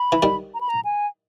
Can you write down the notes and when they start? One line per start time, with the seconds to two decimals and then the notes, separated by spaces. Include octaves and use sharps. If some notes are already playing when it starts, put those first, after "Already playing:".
Already playing: B5
0.12 E3
0.22 D#3 G3
0.54 A#5
0.61 B5
0.69 A#5
0.85 G#5